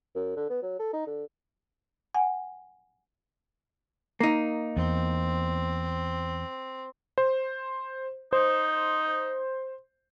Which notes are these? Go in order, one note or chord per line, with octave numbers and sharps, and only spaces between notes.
F#2
D3
B3
F#3
A4
D#4
D3
F#5 G#5
A#3 D#4
E2 C4
C5
D#4 C5